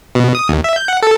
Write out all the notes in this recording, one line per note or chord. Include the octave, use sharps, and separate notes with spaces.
B2
D#6
D#2
E5
G6
F#5
A4